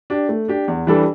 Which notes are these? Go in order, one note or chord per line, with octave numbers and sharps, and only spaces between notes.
D4 G4
A3
D4 G4
E2
E3 G3 D4 A4